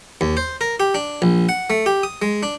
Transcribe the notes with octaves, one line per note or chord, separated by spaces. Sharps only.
D#2
C5
A#4
G4
D4
A#1
F#5
A3
G4
D#6
G#3
D4